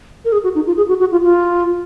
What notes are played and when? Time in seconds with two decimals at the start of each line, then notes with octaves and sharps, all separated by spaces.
0.25 A#4
0.32 G#4
0.44 F#4
0.55 D#4
0.67 F4
0.77 G#4
0.89 F#4
1.00 F#4
1.12 F4
1.23 F4